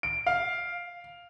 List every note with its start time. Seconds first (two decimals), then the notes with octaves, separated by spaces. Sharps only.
0.03 D7
0.26 F5